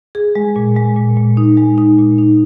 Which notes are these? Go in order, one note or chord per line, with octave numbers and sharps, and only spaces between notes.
G#4
G#3
A#2
G#3
A#2
A#2
D#4
G#3
D#4
A#2
D#4